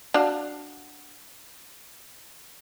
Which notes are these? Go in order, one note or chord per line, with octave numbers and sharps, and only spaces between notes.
D4 F#4 F5